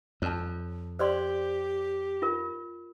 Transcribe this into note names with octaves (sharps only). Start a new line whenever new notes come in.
F2 C#5 A5
G4 C5 D5 C6
F4 A#4